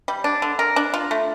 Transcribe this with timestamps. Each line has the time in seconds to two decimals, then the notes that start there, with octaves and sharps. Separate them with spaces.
0.08 G3
0.24 D4
0.42 D3
0.59 A#4
0.76 D4
0.94 F4
1.11 A3